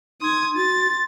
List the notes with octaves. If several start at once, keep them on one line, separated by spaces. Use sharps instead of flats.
D#4 C6 D#6 G#6
F#4 A6